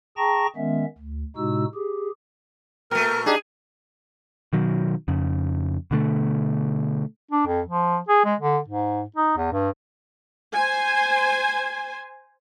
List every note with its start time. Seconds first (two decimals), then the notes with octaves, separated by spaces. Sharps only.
0.17 G#4 G5 A5 A#5 C#6 A#6
0.56 D#3 G#3 B3 C#4 E5
0.98 D2
1.36 A2 C3 G#3 D#4 F#4 E6
1.74 G4 G#4
2.91 A#2 A3 A#4
3.26 D4 D#4 G4 G#4
4.53 B2 D#3 F#3
5.08 F2 C#3
5.91 B2 D3 A3
7.31 D4
7.47 F2
7.68 F3
8.09 G#4
8.25 G#3
8.40 D3
8.68 G#2
9.16 D#4
9.38 E2
9.52 G2
10.53 C5 G#5